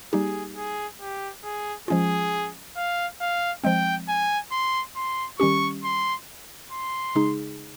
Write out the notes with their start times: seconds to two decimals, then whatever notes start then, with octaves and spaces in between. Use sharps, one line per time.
0.13 G3 A#3 D#4 G4 G#4
0.56 G#4
1.01 G4
1.44 G#4
1.88 F3 G#3 C#4 F4 G#4
2.76 F5
3.21 F5
3.64 F3 G#3 C4 G5
4.08 G#5
4.52 C6
4.96 C6
5.39 D#3 G3 C#4 G4 C#6
5.84 C6
6.72 C6
7.15 C#3 G#3 D#4 G#4